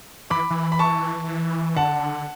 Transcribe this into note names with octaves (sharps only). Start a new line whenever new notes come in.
E3 B5 D6
E3
B5
A5 C#6
D3 F#5 A5